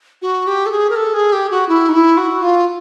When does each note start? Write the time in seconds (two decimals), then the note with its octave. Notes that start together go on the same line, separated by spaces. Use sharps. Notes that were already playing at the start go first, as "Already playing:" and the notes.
0.22 F#4
0.47 G4
0.66 A4
0.71 G#4
0.90 A#4
0.96 A4
1.14 G#4
1.33 G4
1.51 F#4
1.69 E4
1.89 D#4
1.94 E4
2.17 F#4
2.43 F4